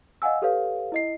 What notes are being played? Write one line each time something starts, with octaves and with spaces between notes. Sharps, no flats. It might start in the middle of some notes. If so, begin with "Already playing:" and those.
D#5 F5 F#5 G#5 E6
G4 A4 B4 C#5 F5
E4 D#5 C7